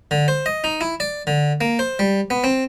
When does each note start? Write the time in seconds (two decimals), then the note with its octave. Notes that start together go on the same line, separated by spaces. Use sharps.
0.11 D3
0.28 C5
0.46 D#5
0.64 D#4
0.81 E4
1.00 D5
1.27 D3
1.61 A#3
1.79 C5
1.99 G3
2.30 B3
2.44 C4